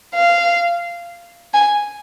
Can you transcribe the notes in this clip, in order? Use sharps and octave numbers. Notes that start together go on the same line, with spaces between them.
F5
G#5